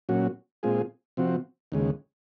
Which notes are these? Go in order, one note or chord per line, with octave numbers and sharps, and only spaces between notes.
A#2 F#3 C#4 F#4
A#2 G#3 C4 F4 G#4
C3 F3 C4 F#4
D#2 C#3 G#3